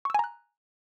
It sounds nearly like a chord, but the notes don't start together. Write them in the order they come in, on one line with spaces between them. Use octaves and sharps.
C#6 E6 G#5 A#5 F#6